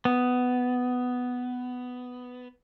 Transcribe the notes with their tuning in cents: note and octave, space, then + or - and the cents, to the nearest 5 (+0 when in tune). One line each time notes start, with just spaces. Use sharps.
B3 +10